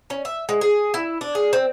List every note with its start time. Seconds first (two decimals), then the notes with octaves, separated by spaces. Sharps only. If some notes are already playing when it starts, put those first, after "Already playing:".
0.10 C#4
0.25 E5
0.49 G#3
0.61 G#4
0.94 E4
1.21 D4
1.35 G#4
1.53 C4